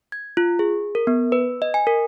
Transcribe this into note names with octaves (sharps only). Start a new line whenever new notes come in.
G#6
F4
G#4
A#4
B3
B4
D#5
G#5
A#4